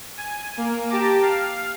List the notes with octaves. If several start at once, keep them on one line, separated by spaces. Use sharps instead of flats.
G#5
A#3
G4 A5 A#5 D6
F5